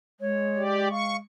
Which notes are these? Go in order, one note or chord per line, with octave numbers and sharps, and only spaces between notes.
G#3 C#5
G4 D5
F5 C#6